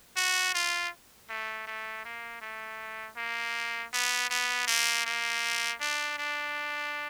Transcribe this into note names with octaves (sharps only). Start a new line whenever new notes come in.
F#4
F4
A3
A3
A#3
A3
A#3
B3
B3
A#3
A#3
D4
D4